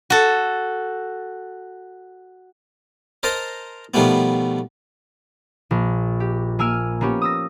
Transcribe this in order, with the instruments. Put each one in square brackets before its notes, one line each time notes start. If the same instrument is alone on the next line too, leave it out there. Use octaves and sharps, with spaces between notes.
[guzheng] F#4 A4
[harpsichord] A#4 C5 D#5 A5 A#5
B2 D#3 F3 G3 A3 B3
[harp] A#1
G4
A#3 G#5 E6 F6 D7 D#7
A#3 B3 C#4 G4
D#6 E6 A#6